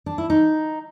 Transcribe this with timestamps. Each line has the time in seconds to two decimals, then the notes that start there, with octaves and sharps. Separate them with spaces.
0.06 D4
0.18 E4
0.30 D#4